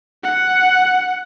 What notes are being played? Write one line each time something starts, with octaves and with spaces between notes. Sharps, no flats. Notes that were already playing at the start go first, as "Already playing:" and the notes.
F#5